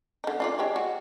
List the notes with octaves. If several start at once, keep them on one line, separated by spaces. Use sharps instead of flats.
D3 D#4
D4 F4 D5
G#3 G4 C#5
F#4